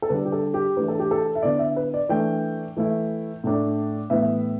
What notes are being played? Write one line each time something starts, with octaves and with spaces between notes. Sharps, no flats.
A4
D3 G3 D4 B4
G4
A4
G4
E3 A3 D4 B4
A4
G4
A4
E5
D3 B3 E4 D5
E5
B4
D5
E3 A3 D4 G5
E3 A3 E4
A2 A3 D4
A2 E3 B3 E4 E5